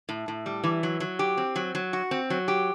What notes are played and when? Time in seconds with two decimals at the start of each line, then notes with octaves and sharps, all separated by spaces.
0.09 A2
0.28 A2
0.46 G3
0.64 E3
0.83 F#3
1.00 F#3
1.19 G4
1.38 C4
1.56 F#3
1.75 F#3
1.93 F#4
2.11 C4
2.30 F#3
2.48 G4